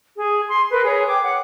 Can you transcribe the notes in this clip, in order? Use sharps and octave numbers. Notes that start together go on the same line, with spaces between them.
G#4
C6
A#4 B4
G#4 C#5
G5 D6
F#5